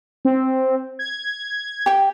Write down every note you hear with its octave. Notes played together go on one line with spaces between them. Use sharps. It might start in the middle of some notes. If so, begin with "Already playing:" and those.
C4
G#6
G4 G5